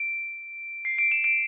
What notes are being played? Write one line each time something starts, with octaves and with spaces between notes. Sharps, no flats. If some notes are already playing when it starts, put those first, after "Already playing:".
Already playing: D7
C7
D7
E7
D7